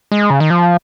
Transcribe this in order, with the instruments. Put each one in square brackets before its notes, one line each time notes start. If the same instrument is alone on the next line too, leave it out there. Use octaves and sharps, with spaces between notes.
[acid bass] G#3
C#3
D#3
F3